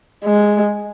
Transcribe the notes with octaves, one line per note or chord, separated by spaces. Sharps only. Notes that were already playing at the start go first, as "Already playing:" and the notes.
G#3